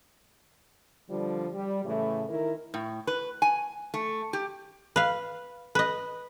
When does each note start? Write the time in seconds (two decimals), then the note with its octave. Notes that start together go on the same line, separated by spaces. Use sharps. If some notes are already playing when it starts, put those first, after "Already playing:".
1.09 D3 F3 G3
1.54 G3
1.84 A2 C#3 E3 A3
2.28 D#3 E4 A#4
2.74 A2
3.07 B4
3.42 G#5
3.94 A3
4.33 G4
4.96 B4 F5
5.75 B4 D#5